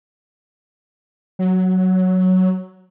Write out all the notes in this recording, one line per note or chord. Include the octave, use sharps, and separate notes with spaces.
F#3